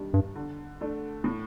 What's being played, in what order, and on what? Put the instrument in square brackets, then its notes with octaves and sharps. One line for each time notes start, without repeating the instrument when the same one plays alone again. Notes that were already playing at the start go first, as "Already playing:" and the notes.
Already playing: [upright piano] D#3 G3 D4
[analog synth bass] G2
[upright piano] D3
A3 D4
A2